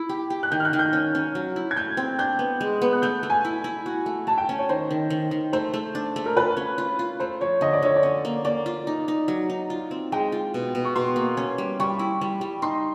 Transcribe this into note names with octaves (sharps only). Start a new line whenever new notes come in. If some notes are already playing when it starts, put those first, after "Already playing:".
Already playing: E4
G4
G4
F#6
D#3 G6
F6
F#6
D#3
G6
C#4
C#4
F#3
E4
G#6
A3 G6
C4
D4 G6
B3
G#3
B3
F#6
A3 G6
A3
G#5
E4
E4
F#4
A3
A3 A5
G5
C#4
C#5
D#3 C5
D#3
D#3
D#3
A3 C5
A3
D4
A3
A#4
F4 B4
C#4
F4
F4
A3 C5
F3 C#5
D3 D#5
D5
D3 C#5
D5
C#4
A#3
A#3 D5
F4
D#4
D#4
F#3
D#4
F4
C4
G#3 G5
F4
B2
B2
C#6
B2 C6
A#3
C#4
G3
G3 C#6
E4
G3
G3
D#4 C6